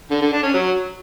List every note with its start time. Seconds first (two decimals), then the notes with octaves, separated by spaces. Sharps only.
0.11 D3
0.22 D3
0.33 D4
0.43 C#4
0.54 F#3